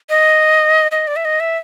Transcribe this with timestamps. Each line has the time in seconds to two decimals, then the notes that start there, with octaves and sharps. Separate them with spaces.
0.10 D#5
0.91 D#5
1.07 D5
1.16 E5
1.25 D#5
1.40 E5